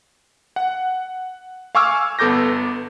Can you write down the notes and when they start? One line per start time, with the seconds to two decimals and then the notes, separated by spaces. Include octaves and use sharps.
0.56 F#5
1.75 F5 G#5 C#6 D6 E6 F6
2.19 G1 B3 A4 D6 G6 A#6